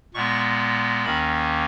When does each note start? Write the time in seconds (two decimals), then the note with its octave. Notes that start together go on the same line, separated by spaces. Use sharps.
0.14 A#2 G#3 B3 C#6
1.05 D#2 D#3 A#3 C#4 B5